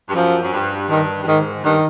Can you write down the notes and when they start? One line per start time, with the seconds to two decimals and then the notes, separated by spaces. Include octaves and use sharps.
0.08 G2
0.15 F#2 F3
0.42 F#2
0.53 G2
0.89 G2 D#3
1.23 G2
1.27 G#2 D#3
1.64 G2 D#3